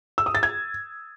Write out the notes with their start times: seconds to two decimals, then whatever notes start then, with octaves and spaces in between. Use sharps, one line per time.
0.18 E6
0.26 D#6
0.35 A6
0.43 G#6